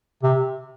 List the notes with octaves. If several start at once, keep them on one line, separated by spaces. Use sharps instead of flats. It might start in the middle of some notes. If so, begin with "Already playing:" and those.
C3